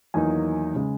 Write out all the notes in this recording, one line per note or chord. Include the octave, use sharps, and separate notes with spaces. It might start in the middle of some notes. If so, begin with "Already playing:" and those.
E2 D#3 F#3 A#3 D#4 G#5
C#3 G#3